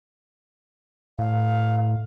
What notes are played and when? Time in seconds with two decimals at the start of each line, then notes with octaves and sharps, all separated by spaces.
1.19 A2 F5